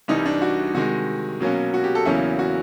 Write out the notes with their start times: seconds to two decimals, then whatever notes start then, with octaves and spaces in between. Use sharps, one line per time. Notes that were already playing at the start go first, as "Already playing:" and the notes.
0.08 C2 C3 E3 G3 D#4
0.26 D4
0.42 F#4
0.74 C3 D#3 G#3 F#4
1.40 B2 F#3 A#3 C#4
1.74 F#4
1.84 G4
1.95 A4
2.05 E2 C#3 F#3 A#3 C#4 E4
2.39 F#4